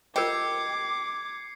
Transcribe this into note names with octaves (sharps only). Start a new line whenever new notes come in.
F4 G4 A#4 D#5 D6 G#6 C7 C#7